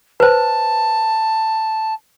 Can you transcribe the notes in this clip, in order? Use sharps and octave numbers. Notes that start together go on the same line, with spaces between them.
B4 C5 A5